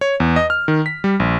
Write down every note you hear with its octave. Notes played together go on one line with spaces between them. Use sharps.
C#5
E2
D#5
F6
D#3
B6
G3
A#1